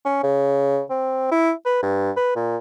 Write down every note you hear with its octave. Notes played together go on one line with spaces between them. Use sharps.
C#4
C#3
C4
E4
B4
G2
B4
A#2